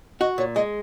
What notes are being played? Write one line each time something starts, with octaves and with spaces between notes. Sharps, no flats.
F#4 D#5
A#2 C#5
G#3 D#5